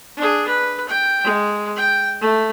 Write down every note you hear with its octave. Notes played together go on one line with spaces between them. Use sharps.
D4 G#4
B4
G5
G#3
G5
A3